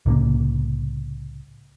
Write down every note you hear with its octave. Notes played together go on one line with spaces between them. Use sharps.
C2 A2 C#3 A#3